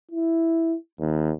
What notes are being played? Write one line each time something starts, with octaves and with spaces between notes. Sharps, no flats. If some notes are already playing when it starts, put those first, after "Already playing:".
E4
D#2